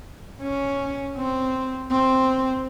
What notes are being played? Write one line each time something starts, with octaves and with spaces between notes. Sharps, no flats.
C#4
C4
C4